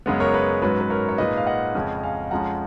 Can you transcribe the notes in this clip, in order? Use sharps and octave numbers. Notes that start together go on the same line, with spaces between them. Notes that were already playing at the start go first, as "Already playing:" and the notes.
F#2 C#3 G#3 B3 B4
A#4 C#5
B4
G#2 F#3 C#4 B4
B4
A#4 C#5
C#5
A#2 G#3 D#4 B4 D#5
F5
D#5 F#5
F2 C#3 G#3 C#4
F5 G#5
F2 F3 G#3 C#4 F#5 A#5